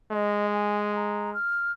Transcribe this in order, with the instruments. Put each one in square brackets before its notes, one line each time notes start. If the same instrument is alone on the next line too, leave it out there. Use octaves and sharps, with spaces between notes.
[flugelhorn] G#3 [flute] D#5
[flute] G#5
A#5
F6